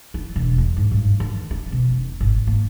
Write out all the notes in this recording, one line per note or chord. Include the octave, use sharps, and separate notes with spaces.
E4
E1
G#3
G#2
G2
D#3
C#4
B2
F1
G#1
A#3